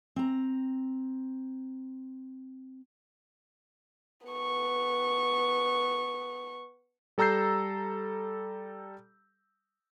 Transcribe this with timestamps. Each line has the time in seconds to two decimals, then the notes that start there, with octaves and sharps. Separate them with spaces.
0.16 C4 A#5
4.27 B3 C#6
7.18 G3 A4 A#5 E6 G6 C7